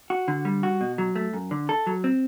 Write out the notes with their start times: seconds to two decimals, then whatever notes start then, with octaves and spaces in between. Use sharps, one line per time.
0.10 F#4
0.28 D3
0.45 G3
0.63 F#4
0.81 B2
0.98 F#3
1.16 A3
1.34 F#2
1.51 D3
1.69 A4
1.87 F#3
2.04 C4